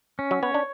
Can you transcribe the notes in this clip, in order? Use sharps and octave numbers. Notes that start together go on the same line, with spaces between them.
C#4
F#3
B3 C#5
D4